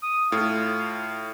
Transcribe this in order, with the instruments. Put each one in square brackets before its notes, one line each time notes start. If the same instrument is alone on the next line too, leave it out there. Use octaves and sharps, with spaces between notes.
[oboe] D#6
[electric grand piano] A2 [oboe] F4